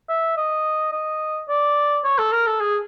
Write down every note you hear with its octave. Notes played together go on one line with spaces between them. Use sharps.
E5
D#5
D#5
D5
C#5
A4
A#4
A4
G#4